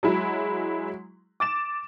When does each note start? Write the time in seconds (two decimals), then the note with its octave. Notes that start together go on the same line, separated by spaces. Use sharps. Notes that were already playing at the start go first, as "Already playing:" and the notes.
0.03 F#3 G#3 E4
1.40 D6 A6 E7